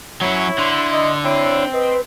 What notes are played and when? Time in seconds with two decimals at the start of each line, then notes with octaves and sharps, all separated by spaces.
0.21 F#3 C#4 E4 C#5
0.59 D3 C6
0.93 D#5
1.24 C4 E4 C#5
1.73 B4 D#5